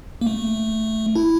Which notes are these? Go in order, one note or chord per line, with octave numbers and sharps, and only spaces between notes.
A#3
A3
E4